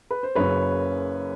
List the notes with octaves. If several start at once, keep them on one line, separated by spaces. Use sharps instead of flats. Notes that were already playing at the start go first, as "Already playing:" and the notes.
B4
C5
F#1 F#2 C#3 B4 C#5